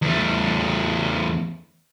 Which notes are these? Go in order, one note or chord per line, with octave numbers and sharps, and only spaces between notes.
E2 A3